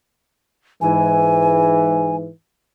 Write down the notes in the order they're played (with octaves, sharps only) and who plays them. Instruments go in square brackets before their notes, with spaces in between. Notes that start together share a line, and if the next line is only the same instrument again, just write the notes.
[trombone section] G#2 E3 [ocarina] G#5